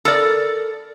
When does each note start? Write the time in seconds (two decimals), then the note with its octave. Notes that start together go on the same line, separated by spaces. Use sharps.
0.05 A4 A#4 D5